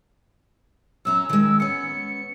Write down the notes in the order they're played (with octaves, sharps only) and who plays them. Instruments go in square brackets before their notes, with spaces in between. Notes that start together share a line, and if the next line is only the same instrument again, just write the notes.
[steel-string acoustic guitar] F#2 C#4 A#5 [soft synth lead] E6
[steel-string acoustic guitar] D#3 G#3
[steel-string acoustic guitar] B3 C#4 [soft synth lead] C#7